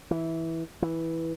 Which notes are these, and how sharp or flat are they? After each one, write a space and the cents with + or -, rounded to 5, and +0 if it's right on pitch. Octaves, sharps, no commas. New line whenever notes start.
E3 -10
E3 -10